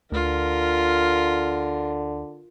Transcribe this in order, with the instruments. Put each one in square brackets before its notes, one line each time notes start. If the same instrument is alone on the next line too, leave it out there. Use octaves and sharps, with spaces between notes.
[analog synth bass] D2 [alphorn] D3 [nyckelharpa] F4 A#4